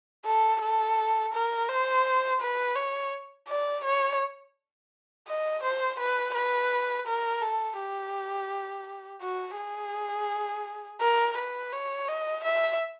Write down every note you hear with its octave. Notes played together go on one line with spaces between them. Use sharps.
A4
A4
A#4
C5
B4
C#5
D5
C#5
D#5
C5
B4
B4
A#4
A4
G4
F#4
G#4
A#4
B4
C#5
D#5
E5